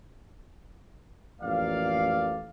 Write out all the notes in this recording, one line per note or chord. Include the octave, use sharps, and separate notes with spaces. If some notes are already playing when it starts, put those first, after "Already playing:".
A1 F2 A#3 D5 F5